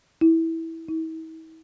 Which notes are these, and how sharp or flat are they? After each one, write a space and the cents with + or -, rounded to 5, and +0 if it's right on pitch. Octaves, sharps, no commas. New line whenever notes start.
E4 -15
E4 -45